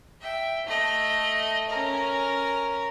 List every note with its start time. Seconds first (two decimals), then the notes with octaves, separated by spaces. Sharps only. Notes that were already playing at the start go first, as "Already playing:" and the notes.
0.21 E5 G5
0.66 A3 D#5
1.69 C#4 A#4